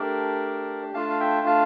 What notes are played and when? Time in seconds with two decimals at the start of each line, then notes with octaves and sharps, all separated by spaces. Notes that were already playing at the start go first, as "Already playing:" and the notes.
Already playing: A3 D4 G4 A#4 D5
0.94 A3 D4 F4 F5 A5
1.09 F5
1.20 E5 G5
1.46 F5 A5